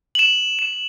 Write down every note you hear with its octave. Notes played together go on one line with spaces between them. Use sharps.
F#7
E7
E7